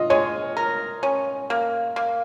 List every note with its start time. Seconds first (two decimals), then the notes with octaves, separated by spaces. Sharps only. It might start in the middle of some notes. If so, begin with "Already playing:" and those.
Already playing: F4 D#5
0.10 G#3 C#5
0.57 A#4
1.03 C#4
1.50 A#3
1.96 A#3